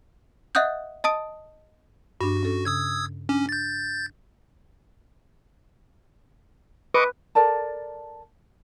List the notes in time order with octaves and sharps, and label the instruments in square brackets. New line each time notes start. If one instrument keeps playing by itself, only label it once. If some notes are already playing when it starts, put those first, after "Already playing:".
[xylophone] D#5 E5 F#5 D#6 F#6 G6
D#5 A5 D#6 D7
[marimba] G2 D4 [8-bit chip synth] F#4
[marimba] C#4 A4
[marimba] C#3 [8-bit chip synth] D#6 E6 G#6
[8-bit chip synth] C#4 [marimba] D4
[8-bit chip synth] G6 A6
[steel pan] B4 [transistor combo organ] D#5 C#6 D6
[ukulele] A4 A#4 D5 A5